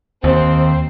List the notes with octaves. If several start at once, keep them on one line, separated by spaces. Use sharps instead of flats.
D#2 C4